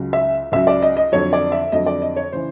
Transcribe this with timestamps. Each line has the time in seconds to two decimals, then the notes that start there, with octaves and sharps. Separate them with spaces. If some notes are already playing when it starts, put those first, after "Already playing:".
Already playing: C#2 C#3 F#3
0.13 E5
0.52 C#2 C#3 F#3 E5
0.67 D5
0.82 D#5
0.97 D#5
1.12 F2 D3 F#3 C#5
1.33 D5
1.52 E5
1.72 F2 D3 F#3 D#5
1.86 D5
2.02 D#5
2.16 C#5
2.32 C#3 E3 C5